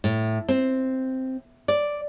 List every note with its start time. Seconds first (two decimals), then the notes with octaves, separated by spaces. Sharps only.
0.04 A2
0.49 C4
1.68 D5